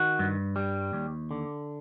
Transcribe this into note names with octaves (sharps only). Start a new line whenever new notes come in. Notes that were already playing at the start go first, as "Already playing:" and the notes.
Already playing: D#3 F#4
G2
G3
D#2
D3